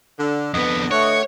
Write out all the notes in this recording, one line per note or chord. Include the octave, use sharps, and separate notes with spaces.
D3
F2 D3 B3 B4 D#5
A3 C#5 F#5 C#6